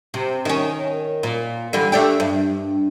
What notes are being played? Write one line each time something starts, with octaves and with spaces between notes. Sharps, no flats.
C3
D#3 C#4
A#2
D3 E3 G3
A3 D4 G4
G2